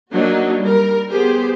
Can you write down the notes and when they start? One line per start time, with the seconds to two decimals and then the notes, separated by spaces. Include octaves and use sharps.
0.12 F#3 A#3 D4 D#4 F#4
0.59 G3 A#4
1.10 B3 G4 G#4 C5